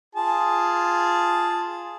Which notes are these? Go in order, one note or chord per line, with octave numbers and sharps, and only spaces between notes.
F4 G#4 A5